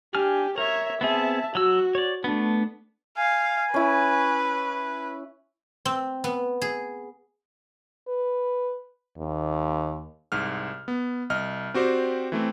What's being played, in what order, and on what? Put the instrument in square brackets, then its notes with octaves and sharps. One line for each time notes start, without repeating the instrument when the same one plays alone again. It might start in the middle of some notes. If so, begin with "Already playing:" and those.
[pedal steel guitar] D4 G#5 F6 [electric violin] G4
[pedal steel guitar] A#4 [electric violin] C#5 E5
[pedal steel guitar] B3 C4 G#4 [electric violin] E5 A5
[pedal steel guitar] F#3 E6 [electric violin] F#4
[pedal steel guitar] C#5 D5
[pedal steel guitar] A3 B3 [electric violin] D4
[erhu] F5 [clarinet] G#5
[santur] C#4 E4 [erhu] B4
[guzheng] C4
B3
G#4
[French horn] B4
D#2
[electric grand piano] C2 G#2 F6
B3
C2 D#5 F6
C4 F#4 G4 C5 D5
E3 A3 C4